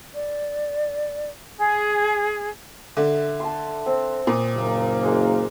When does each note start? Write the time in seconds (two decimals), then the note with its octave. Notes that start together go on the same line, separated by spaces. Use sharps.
0.15 D5
1.57 G#4
2.97 D3 E5
3.40 A5 C6
3.86 C4
4.27 A#2 D#6
4.55 F#1 A#3
5.03 G#3 A#4